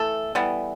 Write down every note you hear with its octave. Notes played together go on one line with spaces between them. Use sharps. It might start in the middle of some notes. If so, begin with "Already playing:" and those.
Already playing: E3 A3 A4
E3 G3 B3